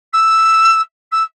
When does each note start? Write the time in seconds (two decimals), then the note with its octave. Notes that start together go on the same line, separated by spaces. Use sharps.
0.13 E6
1.12 E6